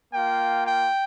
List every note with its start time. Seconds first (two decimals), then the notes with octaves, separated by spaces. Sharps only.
0.13 A#3 F4 G5
0.67 G5